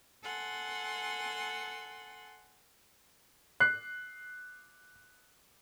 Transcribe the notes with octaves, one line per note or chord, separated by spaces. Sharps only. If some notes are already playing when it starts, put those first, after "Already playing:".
A4 F#5 G#5 C6
F#6 C7